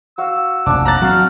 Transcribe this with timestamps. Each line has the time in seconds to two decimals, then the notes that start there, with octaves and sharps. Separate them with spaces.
0.18 F#4 F5 E6
0.66 F1 A#1 D4 A5 D6
0.85 A#5 F#6 A6
1.02 F#3 C4 F#4 F5